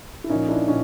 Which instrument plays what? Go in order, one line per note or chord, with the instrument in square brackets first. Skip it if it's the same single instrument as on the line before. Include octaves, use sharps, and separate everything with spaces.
[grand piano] E4
A#2 F3 C#4 D#4
D4 E4
A#2 C#4 D#4